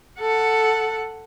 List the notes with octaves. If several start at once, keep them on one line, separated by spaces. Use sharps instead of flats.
A4 F#5